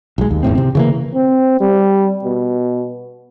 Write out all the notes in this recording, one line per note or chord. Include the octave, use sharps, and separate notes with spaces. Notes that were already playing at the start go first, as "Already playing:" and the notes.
B1 G#3
D#2
G#1 E2 A2 C4
C3 C4
C#3 E3 A#3
C4
G3
B2